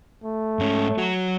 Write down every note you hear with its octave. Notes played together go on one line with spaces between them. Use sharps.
A3
G#2 C#4
F#3 F#4